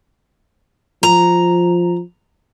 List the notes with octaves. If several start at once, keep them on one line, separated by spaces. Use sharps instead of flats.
F3 A#5